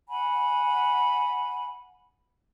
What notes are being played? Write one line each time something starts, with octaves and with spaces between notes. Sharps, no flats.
F#5 G#5 B5